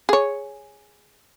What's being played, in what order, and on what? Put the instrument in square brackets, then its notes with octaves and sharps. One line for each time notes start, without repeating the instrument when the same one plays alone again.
[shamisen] G#4 C#5